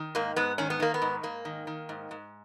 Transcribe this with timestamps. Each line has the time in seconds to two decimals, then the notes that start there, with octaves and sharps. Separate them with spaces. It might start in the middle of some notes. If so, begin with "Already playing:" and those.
Already playing: D#3
0.15 G#2 A#3
0.36 G#2 B3
0.58 D#3 C#4
0.70 B3
0.80 D#3 A#3
0.94 B3
1.02 G#2
1.23 G#2 A#3
1.45 D#3
1.67 D#3
1.89 G#2
2.11 G#2